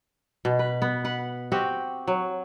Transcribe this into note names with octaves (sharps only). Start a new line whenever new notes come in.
B2
B4
B3
B4 F#5
C4 F#4 G4
F#3